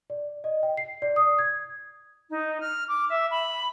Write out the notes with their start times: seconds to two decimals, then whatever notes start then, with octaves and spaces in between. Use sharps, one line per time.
0.10 D5
0.44 D#5
0.63 G5
0.77 C7
1.02 D5
1.16 D#6
1.39 G#6
2.29 D#4
2.60 F6
2.88 D6
3.09 E5
3.30 B5